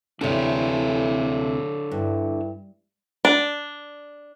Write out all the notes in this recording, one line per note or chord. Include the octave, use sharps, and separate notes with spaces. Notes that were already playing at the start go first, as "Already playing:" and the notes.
D2 C3 E3 D4 A4 C#5
G2 E4
D4